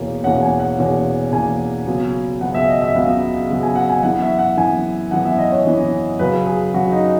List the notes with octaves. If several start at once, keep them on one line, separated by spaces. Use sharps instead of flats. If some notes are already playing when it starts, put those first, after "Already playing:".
Already playing: E2 B2 A#3 C#4
E2 B2 A#3 C#4 F#5
G#5
F#5
E2 B2 A#3 C#4
E2 B2 A#3 C#4 G#5
C#2 C#3 F#3 B3
C#2 C#3 F#3 B3 F#5
E5
D#5
E5
C#2 C#3 F#3 B3
C#2 C#3 F#3 B3
G#5
F#5
G#5
F#2 E3 B3 F#5
E5
F#5
F#2 E3 B3 G#5
F#2 E3 B3 F#5
E5
D#5
C#5
F#2 E3 B3
F#2 C#3 F#3 B4
G#4
F#2 C#3 F#3 F#4
D#4